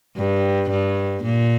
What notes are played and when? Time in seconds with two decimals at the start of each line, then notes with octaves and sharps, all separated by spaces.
0.17 G2
0.70 G2
1.24 A#2